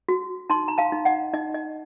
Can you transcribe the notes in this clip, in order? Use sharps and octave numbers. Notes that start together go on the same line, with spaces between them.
F#4
D#4 A5 C6
A#5
F5 A5
D#4
D#5 F#5
D#4 D#5
D#5